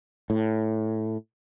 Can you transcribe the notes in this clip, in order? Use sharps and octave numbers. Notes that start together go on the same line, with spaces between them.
A2